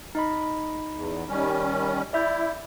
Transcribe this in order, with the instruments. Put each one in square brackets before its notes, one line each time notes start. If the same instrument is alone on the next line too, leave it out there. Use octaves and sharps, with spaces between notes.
[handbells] D#4 D#5 B5
[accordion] E2
D#3 G3 C#4
[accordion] E4 [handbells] D5 E5 G6